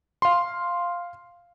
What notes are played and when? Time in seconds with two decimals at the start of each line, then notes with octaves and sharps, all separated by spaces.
0.22 F5 C6